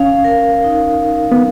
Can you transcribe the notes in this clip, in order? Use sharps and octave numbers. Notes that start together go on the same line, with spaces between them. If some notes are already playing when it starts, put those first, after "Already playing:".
Already playing: C#4 F5
A#4
D#4
D#4
B3